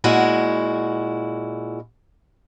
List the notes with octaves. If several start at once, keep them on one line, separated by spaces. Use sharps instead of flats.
A#2 G#3 E4 F#4